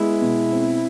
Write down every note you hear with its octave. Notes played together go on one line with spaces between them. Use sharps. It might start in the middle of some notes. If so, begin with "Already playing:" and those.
Already playing: G#3 B3 E4
B2
C4